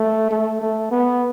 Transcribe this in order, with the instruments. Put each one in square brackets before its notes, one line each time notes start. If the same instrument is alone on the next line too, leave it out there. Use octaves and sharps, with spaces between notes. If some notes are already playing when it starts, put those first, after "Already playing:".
Already playing: [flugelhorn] A3
A3
A3
B3